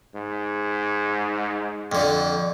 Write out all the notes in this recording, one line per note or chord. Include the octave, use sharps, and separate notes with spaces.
G#2
F2 D3